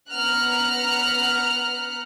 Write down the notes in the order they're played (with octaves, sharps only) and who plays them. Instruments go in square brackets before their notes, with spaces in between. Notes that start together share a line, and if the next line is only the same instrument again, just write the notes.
[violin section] B3 F#5 A#5 F6 F#6